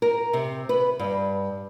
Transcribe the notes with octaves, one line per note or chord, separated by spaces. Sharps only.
A#4
C3
B4
G2